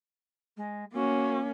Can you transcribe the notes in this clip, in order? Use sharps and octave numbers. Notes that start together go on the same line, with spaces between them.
G#3
A#3 C#4 F#4